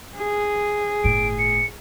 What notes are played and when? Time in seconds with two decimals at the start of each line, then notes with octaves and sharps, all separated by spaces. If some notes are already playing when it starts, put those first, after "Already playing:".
0.16 G#4
1.04 G1 A2 D7
1.39 C#7